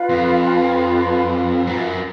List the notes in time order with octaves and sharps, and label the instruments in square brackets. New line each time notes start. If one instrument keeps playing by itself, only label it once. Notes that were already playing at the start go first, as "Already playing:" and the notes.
Already playing: [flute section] F4 B4 F5 B5
[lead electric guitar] F2
G#2
F#2